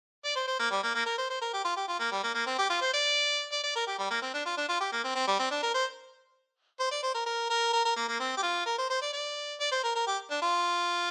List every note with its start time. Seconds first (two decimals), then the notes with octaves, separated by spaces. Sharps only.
0.24 D5
0.36 C5
0.48 C5
0.59 A#3
0.71 G3
0.83 A#3
0.95 A#3
1.06 A#4
1.18 C5
1.30 C5
1.42 A#4
1.53 G4
1.65 F4
1.77 G4
1.88 F4
2.00 A#3
2.12 G3
2.23 A#3
2.35 A#3
2.47 C4
2.58 G4
2.70 F4
2.81 C5
2.93 D5
3.52 D5
3.63 D5
3.75 A#4
3.87 G4
3.99 G3
4.10 A#3
4.22 C4
4.34 D4
4.46 F4
4.58 D4
4.69 F4
4.81 G4
4.92 A#3
5.04 C4
5.15 C4
5.27 G3
5.39 C4
5.51 D4
5.63 A#4
5.74 C5
6.80 C5
6.91 D5
7.03 C5
7.14 A#4
7.26 A#4
7.50 A#4
7.73 A#4
7.85 A#4
7.96 A#3
8.08 A#3
8.20 C4
8.37 G4
8.43 F4
8.66 A#4
8.78 C5
8.90 C5
9.02 D5
9.13 D5
9.60 D5
9.72 C5
9.84 A#4
9.95 A#4
10.07 G4
10.31 D4
10.42 F4